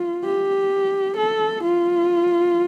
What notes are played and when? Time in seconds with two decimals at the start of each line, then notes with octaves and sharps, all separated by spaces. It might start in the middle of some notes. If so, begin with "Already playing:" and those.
Already playing: F4
0.24 G4
1.17 A4
1.63 F4